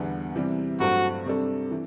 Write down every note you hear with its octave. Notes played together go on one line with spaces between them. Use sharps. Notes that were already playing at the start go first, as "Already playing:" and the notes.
Already playing: E2 D3 G3 B3
C3 E3 G3
G2 F#3 A3 C4 F#4
C3 G3 D4 A4
E3